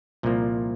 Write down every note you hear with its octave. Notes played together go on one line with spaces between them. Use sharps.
C2 A#2 F3 A#3